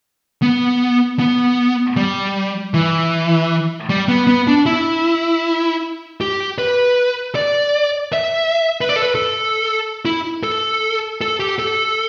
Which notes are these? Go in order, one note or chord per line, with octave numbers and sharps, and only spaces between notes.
B3
B3
G3
E3
G3
B3
B3
D4
E4
G4
B4
D5
E5
B4
D5
A4
B4
A4
E4
A4
A4
G4
A4